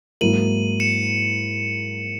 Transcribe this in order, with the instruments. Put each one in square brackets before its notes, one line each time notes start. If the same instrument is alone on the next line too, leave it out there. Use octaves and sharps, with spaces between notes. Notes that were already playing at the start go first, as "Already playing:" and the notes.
[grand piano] G#2 F#3 A#3 E4 A#4 [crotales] D#7 F#7
[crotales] C#7 E7